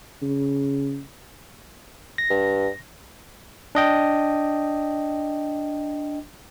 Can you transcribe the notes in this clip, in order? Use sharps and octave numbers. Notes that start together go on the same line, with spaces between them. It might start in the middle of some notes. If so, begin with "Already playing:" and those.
C#3
A#6
G2
D4 D#5 G5